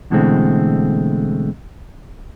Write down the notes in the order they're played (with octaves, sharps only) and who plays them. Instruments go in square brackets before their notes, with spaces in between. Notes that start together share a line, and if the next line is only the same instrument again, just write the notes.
[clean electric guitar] B2 D3 E3 G#3 A3 C4